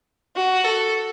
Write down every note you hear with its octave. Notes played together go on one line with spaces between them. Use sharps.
F#4
A4